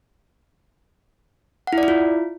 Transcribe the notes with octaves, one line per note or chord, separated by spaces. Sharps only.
F#5
E4
D5
E4
F4